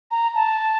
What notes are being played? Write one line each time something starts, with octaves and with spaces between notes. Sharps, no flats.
A#5
A5